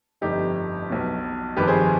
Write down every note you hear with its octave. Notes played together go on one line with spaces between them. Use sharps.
G1 F2 D3 D#4 G4
B1 B2
G1 F2 D#3 G4 B4
G#4 C5